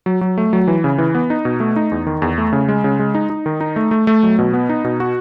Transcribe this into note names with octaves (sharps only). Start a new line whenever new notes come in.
F#3
F#3
A3
F#3
E3
C#3
E3
B3
D#4
B2
A3
D#4
E2
D#3
E2
A3
C#3
G#3
C#3
G#3
D#4
D#4
D#3
D#4
A3
A3
A3
F#3
B2
B3
D#4
B2
F#4